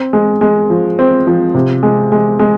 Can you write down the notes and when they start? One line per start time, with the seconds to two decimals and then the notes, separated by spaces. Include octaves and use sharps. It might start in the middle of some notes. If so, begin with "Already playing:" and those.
Already playing: C4
0.13 G#3
0.41 G#3
0.70 F3
0.99 C4
1.27 F3
1.55 C3
1.83 G#3
2.12 G#3
2.39 G#3